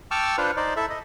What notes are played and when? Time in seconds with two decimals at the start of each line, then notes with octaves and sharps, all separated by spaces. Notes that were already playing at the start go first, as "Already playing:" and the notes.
0.11 G5 A5 C#6 D6 E6 F6
0.38 D4 F4 B4 C5
0.57 D#4 C5 D5
0.76 E4 A4 E5
0.90 D#5